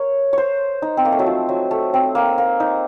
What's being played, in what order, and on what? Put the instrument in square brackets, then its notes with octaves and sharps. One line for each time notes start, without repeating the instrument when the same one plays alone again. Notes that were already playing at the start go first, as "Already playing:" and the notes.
Already playing: [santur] A#4 C#5
C5 C#5
D#4
C4
A#3
A3
F#3
F3
F#3
A3
C4
A#3
A#3
D#4